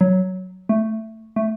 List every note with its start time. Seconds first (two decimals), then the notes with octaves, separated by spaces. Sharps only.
0.01 F#3
0.69 A3
1.36 A3